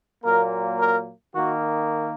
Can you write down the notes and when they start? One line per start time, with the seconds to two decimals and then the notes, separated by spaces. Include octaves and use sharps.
0.23 A#2 F#3 A#3 A#4
0.79 A#4
1.34 D#3 A#3 F#4